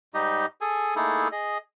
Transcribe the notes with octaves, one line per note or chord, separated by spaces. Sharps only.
G#2 G3 D#4 G4 D#5
G#4 A4 G#5
A3 A#3 D#4 E4 G#4 A4
G#4 D#5